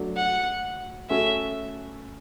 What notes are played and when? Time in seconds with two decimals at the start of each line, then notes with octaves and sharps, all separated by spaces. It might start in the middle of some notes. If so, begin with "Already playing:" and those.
Already playing: F#3 A3 D4
0.17 F#5
1.09 A3 C#4 F#4 A4 E5